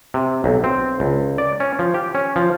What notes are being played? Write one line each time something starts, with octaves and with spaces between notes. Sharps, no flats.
C3
B1
C4
C#2
D5
C#4
F3
G4
C#4
F3